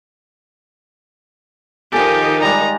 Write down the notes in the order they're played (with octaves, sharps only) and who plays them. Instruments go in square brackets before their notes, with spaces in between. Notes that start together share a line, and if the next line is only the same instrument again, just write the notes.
[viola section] D#3 D#4 [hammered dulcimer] F3 A4 [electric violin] G4 [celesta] G#5
[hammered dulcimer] G3 G#3 [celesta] D5 [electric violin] A#5